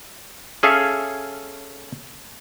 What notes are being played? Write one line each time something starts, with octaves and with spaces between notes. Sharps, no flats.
C#4 G#4 A4 E5 F5